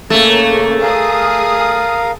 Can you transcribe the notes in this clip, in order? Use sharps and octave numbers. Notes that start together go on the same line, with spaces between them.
C#3 A3 A#3
G#4 A#4 F5 D#6